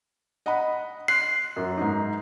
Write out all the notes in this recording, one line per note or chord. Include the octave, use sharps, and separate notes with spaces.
D#5 F#5 B5
C6 F#6 C7
F#2
G#2 D#4